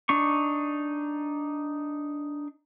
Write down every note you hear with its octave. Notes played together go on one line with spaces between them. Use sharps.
D4 D#4 C#6